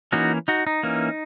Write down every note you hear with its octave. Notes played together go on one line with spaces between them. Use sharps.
E3 A#3 C#4 D#4 F#4
D#4 F#4
D#4
E3 A#3 C#4